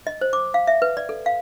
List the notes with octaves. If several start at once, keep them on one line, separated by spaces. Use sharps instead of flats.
D#5
C5
D6
F5
E5
B4
D5
A4
F5